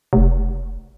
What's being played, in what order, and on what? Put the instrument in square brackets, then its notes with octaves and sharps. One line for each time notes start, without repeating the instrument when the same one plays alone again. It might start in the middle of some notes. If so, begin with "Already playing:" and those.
[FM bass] F1